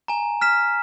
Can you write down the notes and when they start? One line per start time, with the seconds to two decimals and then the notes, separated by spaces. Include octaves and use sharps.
0.08 G#5 A#5
0.41 F6 B6 E7